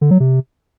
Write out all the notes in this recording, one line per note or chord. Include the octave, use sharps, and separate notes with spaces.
D3
F#3
C3